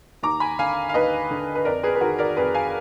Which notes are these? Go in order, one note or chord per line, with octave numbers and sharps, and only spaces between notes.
D#2 A#5 D6
G#5 B5
D3 F5 G#5
F5
D#2 B4 D#5
D3
B4
F2 A#4 D5
G#4 B4
B4
D#3 F#4 A#4
A#4 D5
F2 G#4 B4
F5 G#5